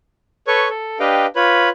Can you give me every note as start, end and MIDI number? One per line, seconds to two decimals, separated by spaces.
0.47 0.68 69
0.47 0.68 71
0.47 0.68 73
0.47 0.68 85
0.69 0.98 69
1.00 1.26 62
1.00 1.26 67
1.00 1.26 71
1.00 1.26 75
1.00 1.26 77
1.00 1.26 79
1.36 1.69 65
1.36 1.69 71
1.36 1.69 73
1.36 1.69 83